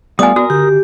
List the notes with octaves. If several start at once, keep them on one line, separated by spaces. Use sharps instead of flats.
G3 A3 B3 F4 D5 G#5 D#6
F#4 A#4 D#6
D3 G4